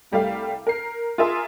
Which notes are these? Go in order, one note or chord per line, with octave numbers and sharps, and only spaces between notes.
C2 G3 A3 F5
A#4 C7
F4 G#4 A#4 E5 G#5 C6